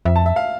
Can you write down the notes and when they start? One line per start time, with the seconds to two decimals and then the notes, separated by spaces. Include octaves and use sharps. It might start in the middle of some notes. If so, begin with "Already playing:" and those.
0.05 F2 E5
0.16 A5
0.26 E5
0.36 F5